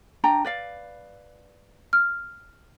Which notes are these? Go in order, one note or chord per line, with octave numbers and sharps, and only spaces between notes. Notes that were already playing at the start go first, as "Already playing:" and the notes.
D4 G5 A#5
B4 D5 F5
F6